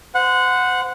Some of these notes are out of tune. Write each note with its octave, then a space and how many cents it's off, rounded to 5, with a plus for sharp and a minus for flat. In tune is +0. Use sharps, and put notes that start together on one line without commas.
C5 -30 F#5 -15